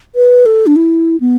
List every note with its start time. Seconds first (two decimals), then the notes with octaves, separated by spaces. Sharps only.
0.15 B4
0.46 A4
0.67 D4
0.76 E4
1.21 B3